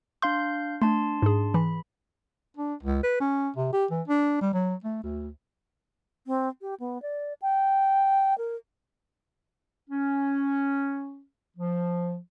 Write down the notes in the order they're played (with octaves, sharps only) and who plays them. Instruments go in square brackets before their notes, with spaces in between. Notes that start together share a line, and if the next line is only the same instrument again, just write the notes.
[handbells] D4 F5 G6 [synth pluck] C6
[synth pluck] A3 [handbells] D4 A5 C6
[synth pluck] G#2 G#4
[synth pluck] E3 [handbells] B5
[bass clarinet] D4
C#2
B4
C#4
C3
G4
E3
D4
G3
F#3
A3
D2
[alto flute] C4
G4
B3
D5
G5
A#4
[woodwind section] C#4
F3